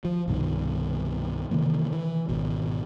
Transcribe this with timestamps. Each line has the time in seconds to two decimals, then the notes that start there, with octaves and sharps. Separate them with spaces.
0.05 F3
0.28 C2 G2 B2 D#3
1.51 C3 D#3 E3 A#3
1.92 E3
2.29 G#1 B2